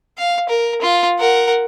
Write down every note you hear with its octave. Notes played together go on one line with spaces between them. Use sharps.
F5
A#4
F4
A#4 F#5